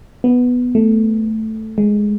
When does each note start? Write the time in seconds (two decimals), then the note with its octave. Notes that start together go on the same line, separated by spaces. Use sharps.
0.24 B3
0.75 A3
1.78 G#3